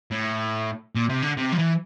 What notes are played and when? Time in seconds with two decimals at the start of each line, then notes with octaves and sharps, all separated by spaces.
0.11 A2
0.95 A#2
1.10 C3
1.23 D3
1.37 C3
1.52 F3
1.59 E3